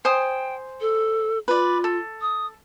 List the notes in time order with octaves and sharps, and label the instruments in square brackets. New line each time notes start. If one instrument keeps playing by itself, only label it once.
[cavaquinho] C5 G#5 D#6 [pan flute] G5
[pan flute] A4
[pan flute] F4 [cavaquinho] B4 D5
[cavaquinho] A4
[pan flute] D#6